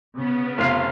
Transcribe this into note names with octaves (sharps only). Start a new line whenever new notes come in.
C#3 B3
F1 F4 F6 C7